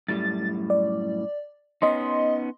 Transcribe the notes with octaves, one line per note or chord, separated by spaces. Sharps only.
F#2 A2 G3 A6
D5
B3 C#4 D#4 D#5 C6